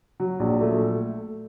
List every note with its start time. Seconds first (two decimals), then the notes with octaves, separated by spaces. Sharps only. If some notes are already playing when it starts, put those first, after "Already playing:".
0.20 F#3
0.40 A#1
0.61 A3